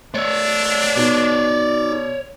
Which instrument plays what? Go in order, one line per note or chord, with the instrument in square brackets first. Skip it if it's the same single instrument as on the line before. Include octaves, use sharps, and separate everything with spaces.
[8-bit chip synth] A3 E6 [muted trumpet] D4 [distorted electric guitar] C#5 D5
[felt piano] B2 [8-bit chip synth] D#4 F#4 D6